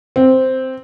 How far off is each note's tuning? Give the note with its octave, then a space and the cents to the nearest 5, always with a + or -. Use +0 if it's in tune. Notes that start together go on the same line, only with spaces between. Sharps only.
C4 -5